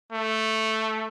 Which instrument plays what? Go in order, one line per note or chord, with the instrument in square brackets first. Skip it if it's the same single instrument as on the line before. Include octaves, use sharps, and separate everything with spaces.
[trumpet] A3